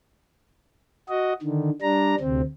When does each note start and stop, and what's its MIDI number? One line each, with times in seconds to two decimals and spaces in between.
1.09 1.33 66
1.09 1.33 75
1.42 1.70 50
1.42 1.70 51
1.82 2.15 55
1.82 2.15 62
1.82 2.15 82
2.20 2.42 38
2.20 2.42 48
2.20 2.42 60